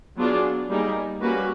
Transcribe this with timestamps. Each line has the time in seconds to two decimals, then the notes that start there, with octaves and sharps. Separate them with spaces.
0.17 F#3 B3 D4 F4 G#4
0.69 G3 A#3 D#4 G#4
1.21 G3 A#3 C#4 F#4 B4